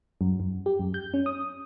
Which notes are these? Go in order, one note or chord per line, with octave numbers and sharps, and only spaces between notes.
F#2
F#2
G4
F#2
G6
C#4
D#6